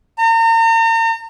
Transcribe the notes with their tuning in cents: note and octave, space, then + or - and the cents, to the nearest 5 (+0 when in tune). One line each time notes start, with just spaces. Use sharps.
A#5 -40